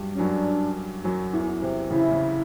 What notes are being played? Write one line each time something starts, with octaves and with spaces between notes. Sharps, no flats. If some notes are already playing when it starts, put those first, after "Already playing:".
Already playing: G2 F#3 G3
C#4
F#2 F#3 D4
F#2 F#3
E2 E3
C3
C#3 E4
C#3